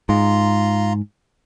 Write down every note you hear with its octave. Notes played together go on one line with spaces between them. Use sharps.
G#2 F4 A#5 C6